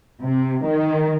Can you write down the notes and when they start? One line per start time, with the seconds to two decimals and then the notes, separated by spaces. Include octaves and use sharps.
0.21 C3
0.65 D#3